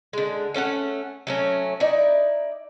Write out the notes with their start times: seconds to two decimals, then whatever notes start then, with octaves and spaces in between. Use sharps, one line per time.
0.13 D3 G#3
0.54 A3 C#4 F5 F#5
1.27 F#3 A3 C#4
1.80 D#4 E4 D5